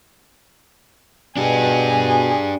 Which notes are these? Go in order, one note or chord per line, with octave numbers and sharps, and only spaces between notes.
B2 D4 G4 G#4